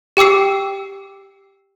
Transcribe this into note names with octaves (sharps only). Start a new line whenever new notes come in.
G4 G5 D6 E6 C7